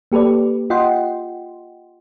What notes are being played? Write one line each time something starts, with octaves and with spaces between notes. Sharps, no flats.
A#3 G4 A4 B4 D5
F4 D#5 F#5 G5 C6